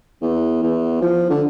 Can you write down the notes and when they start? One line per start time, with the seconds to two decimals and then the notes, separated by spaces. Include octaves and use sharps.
0.22 E2
0.63 E2
1.02 F3
1.30 D3